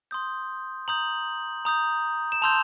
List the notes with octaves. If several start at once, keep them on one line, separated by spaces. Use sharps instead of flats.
C6 D#6 G6
A#5 D#6 G6 F#7
A#5 D#6 G6
E7
A5 C6 E6 G6 F7